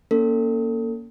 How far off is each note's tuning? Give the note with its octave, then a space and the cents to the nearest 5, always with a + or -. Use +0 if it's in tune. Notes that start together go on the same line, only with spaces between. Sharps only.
A#3 +10 C#4 +25 A4 +30